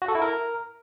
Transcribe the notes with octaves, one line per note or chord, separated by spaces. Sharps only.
F#4
A4
E4
A#4